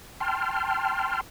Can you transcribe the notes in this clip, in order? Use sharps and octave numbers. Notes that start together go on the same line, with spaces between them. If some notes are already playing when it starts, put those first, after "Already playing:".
G5 A5 C6 F6